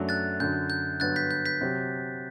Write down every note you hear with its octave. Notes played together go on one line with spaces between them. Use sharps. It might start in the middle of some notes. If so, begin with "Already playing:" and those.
Already playing: F#2 F#3 A3 D4
F#6 A6
F#2 D3 F#3 G6
G6
G2 D3 F#3 B3 F#6 A6
G6 B6
G6
G6 B6
C3 F#3 C4 G4